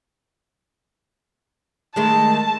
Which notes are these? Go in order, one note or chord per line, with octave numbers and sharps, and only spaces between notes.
D#3 G#3 A3 A5